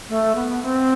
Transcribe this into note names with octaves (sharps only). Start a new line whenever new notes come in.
A3
B3
C4